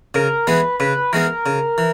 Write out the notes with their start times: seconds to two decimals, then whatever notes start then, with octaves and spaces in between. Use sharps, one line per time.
0.14 C#3 A#4
0.47 E3 G#3 B3 B4
0.80 C#3 B4
1.13 E3 G#3 B3 A#4
1.46 C#3
1.78 E3